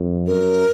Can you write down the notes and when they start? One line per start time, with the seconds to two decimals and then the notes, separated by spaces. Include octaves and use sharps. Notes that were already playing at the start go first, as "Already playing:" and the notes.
Already playing: F2
0.27 F#2 A#4